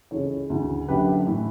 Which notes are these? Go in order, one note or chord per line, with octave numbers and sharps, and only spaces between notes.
C#2 C#3 E3 A4 C#5
D2 C#3 E3
F#1 F#2 D3 G4 B4
A2 E3